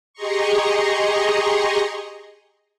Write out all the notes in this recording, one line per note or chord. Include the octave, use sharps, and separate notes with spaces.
G4 G#4 D#5 A#5 C6 C#6